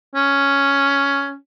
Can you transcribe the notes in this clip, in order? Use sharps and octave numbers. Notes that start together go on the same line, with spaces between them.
C#4